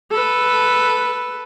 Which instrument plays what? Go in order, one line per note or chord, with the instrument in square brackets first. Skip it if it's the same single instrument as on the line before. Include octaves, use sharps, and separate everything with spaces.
[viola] A4 B4